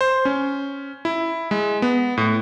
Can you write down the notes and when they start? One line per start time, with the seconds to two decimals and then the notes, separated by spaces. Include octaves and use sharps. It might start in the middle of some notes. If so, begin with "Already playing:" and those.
0.01 C5
0.25 C#4
1.05 E4
1.51 G#3
1.82 B3
2.17 A2